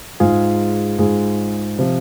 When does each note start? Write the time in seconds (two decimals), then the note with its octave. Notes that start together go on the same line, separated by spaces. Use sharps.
0.20 G#2 G#3 F4 G#4
0.98 G#2 G#3 F4 G#4
1.79 C3 F3